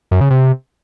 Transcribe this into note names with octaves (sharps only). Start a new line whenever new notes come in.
F#2
C#3
C3